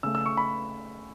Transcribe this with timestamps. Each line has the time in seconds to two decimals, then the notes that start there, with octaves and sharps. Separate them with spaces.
0.03 C#3 A3 E6
0.15 E6
0.26 C#6
0.37 B5